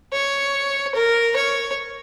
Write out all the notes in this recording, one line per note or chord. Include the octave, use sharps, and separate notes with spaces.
C#5
A#4
C#5